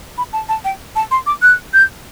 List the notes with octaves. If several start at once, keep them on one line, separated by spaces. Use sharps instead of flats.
B5
A5
A5
G5
A5
C6
D6
F#6
G6